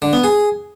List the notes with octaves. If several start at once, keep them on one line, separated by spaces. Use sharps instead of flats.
D3
B3
G#4